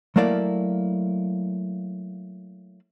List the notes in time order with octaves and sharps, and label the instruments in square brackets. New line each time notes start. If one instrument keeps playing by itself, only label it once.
[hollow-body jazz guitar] F#3 A3 A#3 E4 D5 F5